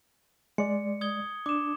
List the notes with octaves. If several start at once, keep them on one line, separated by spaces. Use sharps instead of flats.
G#3 D5 C#7
D#6 G#6 G7
D4 D6 E7